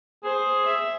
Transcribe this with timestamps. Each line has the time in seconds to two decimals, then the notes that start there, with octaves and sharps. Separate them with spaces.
0.24 G#4 C5
0.66 E5